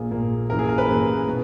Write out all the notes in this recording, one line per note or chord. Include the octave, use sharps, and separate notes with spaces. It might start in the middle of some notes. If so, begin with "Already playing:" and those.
Already playing: A#1 A#2 A#3 G#4
A#1 A#2 A#3
F#2 E3 A#3 A#4
G#4
A#4
B4
F#2 E3 A#3
B2